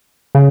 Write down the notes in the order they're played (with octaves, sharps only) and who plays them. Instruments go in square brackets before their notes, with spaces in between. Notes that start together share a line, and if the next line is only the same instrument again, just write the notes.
[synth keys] C#3